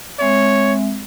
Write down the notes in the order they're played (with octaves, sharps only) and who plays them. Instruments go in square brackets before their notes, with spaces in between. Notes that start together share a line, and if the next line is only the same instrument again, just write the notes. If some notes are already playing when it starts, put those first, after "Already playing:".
[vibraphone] G#3 C4 E5 [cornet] C#5